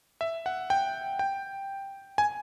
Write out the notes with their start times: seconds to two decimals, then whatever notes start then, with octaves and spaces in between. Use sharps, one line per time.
0.21 E5
0.46 F#5
0.70 G5
1.19 G5
2.18 G#5